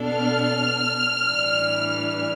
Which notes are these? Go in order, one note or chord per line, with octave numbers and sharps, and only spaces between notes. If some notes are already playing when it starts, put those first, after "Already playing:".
Already playing: B2 B3 D4 A4
F6
A2 E3 G3 D4